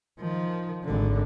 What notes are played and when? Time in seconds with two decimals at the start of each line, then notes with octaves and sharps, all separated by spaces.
0.19 D#3 F3
0.84 G#1 D3